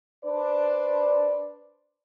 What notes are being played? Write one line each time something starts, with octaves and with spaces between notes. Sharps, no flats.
D4 B4 C5 D5